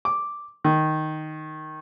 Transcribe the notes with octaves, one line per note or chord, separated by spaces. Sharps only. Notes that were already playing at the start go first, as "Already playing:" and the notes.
D6
D#3